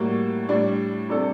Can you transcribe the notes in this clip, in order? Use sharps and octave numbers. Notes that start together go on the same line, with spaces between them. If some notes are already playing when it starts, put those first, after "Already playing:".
Already playing: A2 G3 A#3 F#4
A2 G3 D4
C3 G3 D4 A4